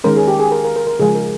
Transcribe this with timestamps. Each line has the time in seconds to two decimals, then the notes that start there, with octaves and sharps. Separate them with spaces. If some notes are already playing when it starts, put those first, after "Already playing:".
0.04 D#3 G#3 C#4 A#4
0.16 G#4
0.28 G4
0.39 G#4
0.52 A#4
0.64 A#4
0.76 A#4
0.87 A#4
0.99 C#3 F3 G#3 G#4
1.15 A#4